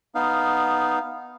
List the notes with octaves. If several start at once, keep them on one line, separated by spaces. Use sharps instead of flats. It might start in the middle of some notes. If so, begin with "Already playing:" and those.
B3 D#4 F5